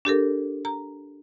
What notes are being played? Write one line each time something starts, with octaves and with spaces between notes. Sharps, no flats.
D4 G4 A4 A#4
A#5